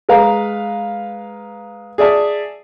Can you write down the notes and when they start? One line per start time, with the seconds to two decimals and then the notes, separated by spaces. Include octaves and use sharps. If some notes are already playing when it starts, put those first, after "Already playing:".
0.09 G#3 B4 F5 A#5
1.98 G#4 D5 E5 A5